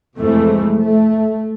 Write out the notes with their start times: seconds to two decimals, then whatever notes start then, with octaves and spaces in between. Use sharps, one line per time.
0.17 F2 C3 E3 G#3 A3
0.79 A3